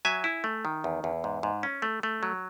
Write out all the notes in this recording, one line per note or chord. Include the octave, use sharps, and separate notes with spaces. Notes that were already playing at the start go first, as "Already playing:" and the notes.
F#3 E5 G#5
E4
A3
D#3
E2
E2
G#2
G#2
C#4
A3
A3
F#3